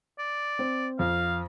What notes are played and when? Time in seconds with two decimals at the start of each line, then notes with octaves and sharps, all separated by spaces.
0.19 D5
0.59 C4
0.99 F2 F5